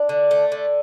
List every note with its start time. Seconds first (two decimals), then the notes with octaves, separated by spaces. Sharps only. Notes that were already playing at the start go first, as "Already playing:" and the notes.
Already playing: D4
0.09 D3
0.31 A3
0.52 D3